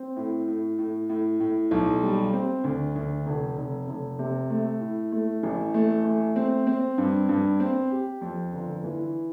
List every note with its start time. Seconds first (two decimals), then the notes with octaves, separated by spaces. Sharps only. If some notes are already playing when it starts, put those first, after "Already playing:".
Already playing: C4
0.17 A2
0.48 A2
0.79 A2
1.10 A2
1.40 A2
1.71 B1
2.03 G3
2.33 C4
2.64 D2
2.96 D2
3.26 F1
3.57 F1
3.88 F1
4.19 C3
4.50 A3
4.81 A2
5.12 A3
5.43 A1
5.74 A3
6.05 A3
6.36 C4
6.67 C4
6.98 G2
7.29 G2
7.60 C4
7.91 G4
8.21 F2
8.53 G1
8.84 E3